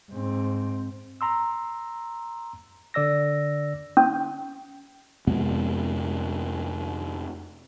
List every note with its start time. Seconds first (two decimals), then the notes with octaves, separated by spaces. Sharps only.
0.11 G#2 C4
1.21 A#5 C6 E6
2.94 D3 D5 E6 A#6
3.97 C#4
5.27 F2 C3 G#3 B3